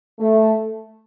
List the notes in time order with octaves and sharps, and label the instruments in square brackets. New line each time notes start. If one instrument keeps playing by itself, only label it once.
[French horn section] A3